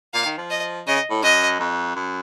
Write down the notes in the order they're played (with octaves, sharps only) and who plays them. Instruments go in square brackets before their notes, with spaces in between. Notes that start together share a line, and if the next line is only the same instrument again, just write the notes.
[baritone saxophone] A#2 [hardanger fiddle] F5
[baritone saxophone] D#3
F3
[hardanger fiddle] D#5
[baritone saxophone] C#3 [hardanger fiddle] D#5
[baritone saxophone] A2
[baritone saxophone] F#2 [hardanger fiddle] D#5
[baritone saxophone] F2
F#2